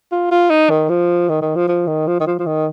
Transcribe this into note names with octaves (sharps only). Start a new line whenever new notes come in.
F4
F4
D#4
D#3
F3
D#3
D#3
F3
F3
D#3
F3
D#3
F3
F3
D#3